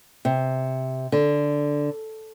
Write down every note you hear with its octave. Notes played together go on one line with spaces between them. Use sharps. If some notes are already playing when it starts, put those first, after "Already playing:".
C3
D3